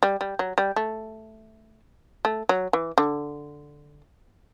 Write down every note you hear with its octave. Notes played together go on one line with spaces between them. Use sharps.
G3
G3
F#3
G3
A3
A3
F#3
E3
D3